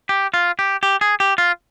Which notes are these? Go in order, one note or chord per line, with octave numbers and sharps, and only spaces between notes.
G4
F4
G4
G4
G#4
G4
F4